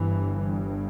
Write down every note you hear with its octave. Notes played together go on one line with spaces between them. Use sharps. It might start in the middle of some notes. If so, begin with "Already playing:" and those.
Already playing: G1 G2 E3